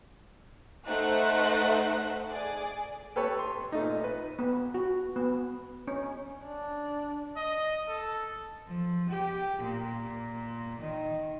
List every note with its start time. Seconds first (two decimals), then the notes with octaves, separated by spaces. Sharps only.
0.87 A3 D#4 C5 E5 F#5 F#6
2.29 G#4 D5
3.16 G4 A4 B4 C#5
3.39 C6
3.72 A#2 A3 D#4
4.04 B4
4.39 B3
4.74 F#4
5.16 B3
5.88 C#4
6.45 D4
7.37 D#5
7.89 A4
8.67 F3
9.09 G4
9.62 A#2
10.81 D#3